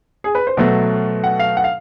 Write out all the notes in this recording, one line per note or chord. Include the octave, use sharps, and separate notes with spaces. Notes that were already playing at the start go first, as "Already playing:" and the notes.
G#4
B4
C5
B2 F#3 A3
F#5
F5
F#5
F5